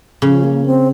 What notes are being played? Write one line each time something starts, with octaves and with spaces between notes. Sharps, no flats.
C#3 F3
A#3
C4